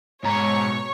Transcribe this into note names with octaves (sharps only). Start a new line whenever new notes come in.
G#2 B2 C#5 A#5 C#6